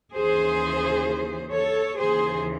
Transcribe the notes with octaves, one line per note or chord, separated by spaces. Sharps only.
D#2 C#3 E3 G#4 C5
A4 C#5
D#2 C#3 E3 G#4 C5